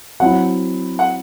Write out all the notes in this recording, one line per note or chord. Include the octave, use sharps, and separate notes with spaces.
F#3 C4 E4 F#5
F#5